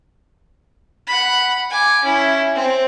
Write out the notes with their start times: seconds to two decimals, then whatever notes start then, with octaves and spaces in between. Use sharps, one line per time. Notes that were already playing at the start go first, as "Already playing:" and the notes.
1.07 F#5 B5
1.70 G#5 D6
2.03 C#4 E4
2.56 C4